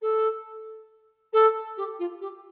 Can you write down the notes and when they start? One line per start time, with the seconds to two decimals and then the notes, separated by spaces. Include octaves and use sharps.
0.01 A4
1.33 A4
1.77 G4
1.99 F4
2.21 G4